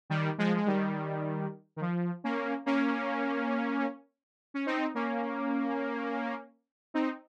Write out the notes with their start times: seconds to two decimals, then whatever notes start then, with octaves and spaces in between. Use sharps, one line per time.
0.10 D#3 G3
0.38 F3 G#3
0.56 G#3
0.66 D#3 G3
1.76 D#3
1.81 F3
2.24 A#3 C#4
2.66 A#3 C#4
4.54 C#4
4.66 C4 D#4
4.95 A#3 C#4
6.94 C4 D#4